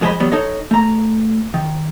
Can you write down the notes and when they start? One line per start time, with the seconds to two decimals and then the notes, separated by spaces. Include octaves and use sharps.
0.01 F2 G#3 G#4 C5 D#5 B5
0.20 E2 F#3 G3 B3
0.32 D#4 A4 C#5 D#5
0.71 A3 A#5
1.54 D#3